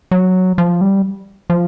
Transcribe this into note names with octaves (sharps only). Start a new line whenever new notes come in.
F#3
F3
G3
F3